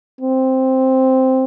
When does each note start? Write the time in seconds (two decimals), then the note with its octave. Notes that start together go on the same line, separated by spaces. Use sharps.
0.21 C4